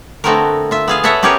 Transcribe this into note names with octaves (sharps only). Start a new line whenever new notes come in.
D3 A3 B3 C4 F#4 A#4
F4 E5
B3 G#4 F5
A4 B4 C#5 E5 F#5 A5
B3 C#4 G4 G#4 A#4 C#5